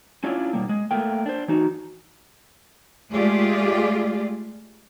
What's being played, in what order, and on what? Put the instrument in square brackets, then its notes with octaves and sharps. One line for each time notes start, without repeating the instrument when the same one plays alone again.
[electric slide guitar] C#4 D4 E4 F4 C#5 D5
B2 G3 A#3
G#3
A3 A#3 A#4 G5
D4 C5
E3 D#4 F#4
[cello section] G#3 A3 F4 G4 G#4 D5